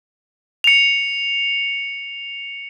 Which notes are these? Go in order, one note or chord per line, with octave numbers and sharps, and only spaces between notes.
C#7 F7